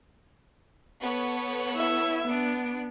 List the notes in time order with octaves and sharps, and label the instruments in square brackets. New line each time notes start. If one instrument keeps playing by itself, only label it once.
[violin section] B3 A4 C#5
[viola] E4 E5
[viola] B3 [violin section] D4 D7